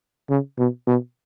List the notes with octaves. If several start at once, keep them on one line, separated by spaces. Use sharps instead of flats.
C#3
B2
B2